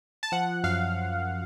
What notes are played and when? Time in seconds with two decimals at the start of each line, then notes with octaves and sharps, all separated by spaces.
0.23 A5
0.32 F3 F#5
0.64 F#2 F5